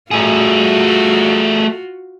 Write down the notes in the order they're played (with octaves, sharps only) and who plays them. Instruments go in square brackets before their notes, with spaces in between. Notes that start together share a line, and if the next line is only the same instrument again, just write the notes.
[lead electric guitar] A3 G#4 [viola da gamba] F4 F#4